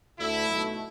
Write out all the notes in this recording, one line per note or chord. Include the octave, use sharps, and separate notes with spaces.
D2 D3 A3 E4
B1 B2 A3